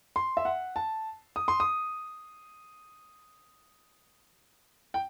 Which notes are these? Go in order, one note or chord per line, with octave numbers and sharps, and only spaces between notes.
C6
E5
F#5
A5
D#6
C6
D#6
G5